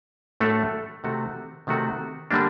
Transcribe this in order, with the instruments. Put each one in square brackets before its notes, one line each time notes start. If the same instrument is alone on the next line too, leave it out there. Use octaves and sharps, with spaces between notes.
[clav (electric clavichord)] A2 A3 D4 F#4 A4
C3 D#3 A3 C4 F#4
C3 D#3 A3 C4 F#4
D3 G3 A#3 D4